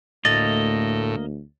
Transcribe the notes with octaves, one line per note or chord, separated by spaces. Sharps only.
D2 A2 A#3 D#5 A6